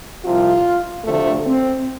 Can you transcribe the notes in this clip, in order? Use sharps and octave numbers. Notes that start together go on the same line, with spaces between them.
C2 C3 F3 F4
D2 C3 F3 A3
C4